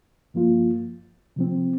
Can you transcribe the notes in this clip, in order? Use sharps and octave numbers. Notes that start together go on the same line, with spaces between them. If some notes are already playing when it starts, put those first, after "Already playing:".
G2 F3 A#3 F4
C3 F3 C4